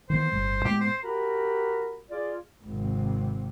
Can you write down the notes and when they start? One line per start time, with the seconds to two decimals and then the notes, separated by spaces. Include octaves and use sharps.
0.10 D#3 E3 B3 C5
0.32 G1 A2 G3
0.65 A2 G#3 B3 G4
0.81 C5
1.03 F#4 G4 A#4 A#5 B5
2.10 F4 G#4 D5
2.63 G#1 C3